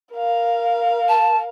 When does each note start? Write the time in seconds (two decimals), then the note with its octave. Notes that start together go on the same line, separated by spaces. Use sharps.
0.14 A#4 F5
1.08 A5